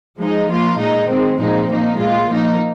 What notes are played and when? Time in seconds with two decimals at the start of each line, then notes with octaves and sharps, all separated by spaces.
0.18 F3 G#3 D#4
0.49 F3 A#3 F4
0.78 A#2 G#3 D#4
1.08 D#3 G#3 C4
1.38 A#2 F3 G#3 C4 D#4
1.67 F3 A#3 D#4
1.98 A#2 G#3 F4
2.28 F3 A#3 D#4